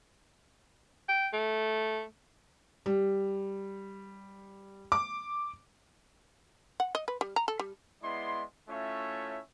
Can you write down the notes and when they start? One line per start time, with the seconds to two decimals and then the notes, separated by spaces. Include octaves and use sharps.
1.09 G5
1.33 A3
2.86 G3
4.92 D6
6.80 F#5
6.95 D#5
7.08 B4
7.21 G3
7.36 A#5
7.48 A4
7.59 G3
8.03 G#3 B3 E4 D5 C6
8.69 A3 C#4 E4 F4 C#5 E5